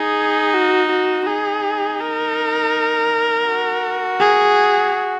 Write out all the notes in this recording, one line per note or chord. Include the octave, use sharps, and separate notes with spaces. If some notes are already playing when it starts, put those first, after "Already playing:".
Already playing: D#4 G#4
F#4
F#4
D#4 G#4
A#4
F#4
G#4